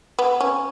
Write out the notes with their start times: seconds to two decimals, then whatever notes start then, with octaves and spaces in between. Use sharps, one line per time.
0.19 B3
0.41 C#4